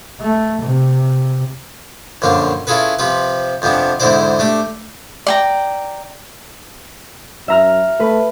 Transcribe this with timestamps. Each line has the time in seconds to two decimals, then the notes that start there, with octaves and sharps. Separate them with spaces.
0.20 A3
0.62 C3
2.22 A#1 F#2 D3 D4 F5
2.67 C#4 E4 F4 G#4 A4 B4
2.99 C3 F3 G4 B4
3.62 F2 C3 F3 B3 D4
4.00 E2 G#2 D3 E4 C5 D5
4.39 A3 D4 G4
5.27 D5 G5 A#5
7.48 F#2 E5 A#5 F6
8.00 A3 B4